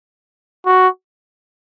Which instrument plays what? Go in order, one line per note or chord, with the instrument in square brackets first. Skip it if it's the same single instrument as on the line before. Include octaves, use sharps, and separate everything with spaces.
[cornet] F#4